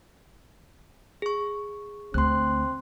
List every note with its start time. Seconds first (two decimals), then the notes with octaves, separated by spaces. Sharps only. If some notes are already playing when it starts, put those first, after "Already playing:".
1.22 G#4 C#6
2.14 D2 C4 C6 F#6